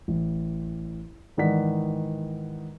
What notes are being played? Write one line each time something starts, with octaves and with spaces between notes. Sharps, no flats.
A1
G#2 D#3 E3 D5 F#5 B6